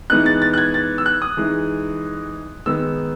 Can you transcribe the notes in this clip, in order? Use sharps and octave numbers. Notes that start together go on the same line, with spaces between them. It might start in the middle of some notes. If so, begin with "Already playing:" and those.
E3 G#3 B3 D#4 F#6
A6
A6
F#6
G#6
A6
E6
F#6
D#6
E3 G#3 D#4
D#3 G#3 B3 D#4 E6